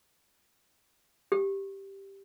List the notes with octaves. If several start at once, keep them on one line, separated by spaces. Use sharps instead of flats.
G4